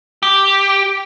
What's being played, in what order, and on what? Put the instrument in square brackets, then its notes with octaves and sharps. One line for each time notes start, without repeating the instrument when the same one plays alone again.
[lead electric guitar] G4